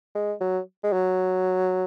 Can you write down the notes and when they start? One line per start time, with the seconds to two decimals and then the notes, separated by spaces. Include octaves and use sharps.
0.15 G#3
0.41 F#3
0.83 G#3
0.93 F#3